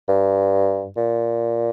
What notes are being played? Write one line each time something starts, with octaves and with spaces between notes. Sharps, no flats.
G2
A#2